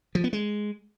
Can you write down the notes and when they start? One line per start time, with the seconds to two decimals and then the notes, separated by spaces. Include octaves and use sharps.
0.15 F3
0.24 B3
0.33 G#3